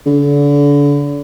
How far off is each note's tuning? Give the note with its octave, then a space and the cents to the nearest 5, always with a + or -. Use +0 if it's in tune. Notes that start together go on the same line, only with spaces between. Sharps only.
D3 -35